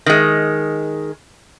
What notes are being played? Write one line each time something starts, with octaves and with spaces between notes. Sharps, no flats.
D#3 G#3